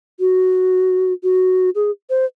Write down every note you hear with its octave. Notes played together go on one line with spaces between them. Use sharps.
F#4
F#4
G#4
C5